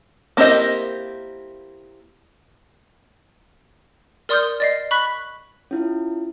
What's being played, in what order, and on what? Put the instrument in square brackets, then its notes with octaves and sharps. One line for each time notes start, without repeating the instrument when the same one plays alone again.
[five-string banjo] A#3 C4 E4 G4 D#5
[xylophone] A#4 D5 C6 D#6 F6 G6
D5 D#5 C7
B5 C#6 F#6 B6
[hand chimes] C#4 E4 F4